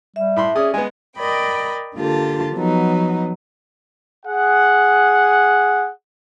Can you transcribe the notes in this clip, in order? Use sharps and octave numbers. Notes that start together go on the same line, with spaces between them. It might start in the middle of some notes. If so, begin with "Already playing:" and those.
G3 E5
A2 B5 C6
C#4 G#4 D5 D#6
G#3 B3 G#5
A#4 D5 D#5 G5 B5
D3 A#3 F4 G4 A4 A5
F3 F#3 B3 D#4
G#4 F#5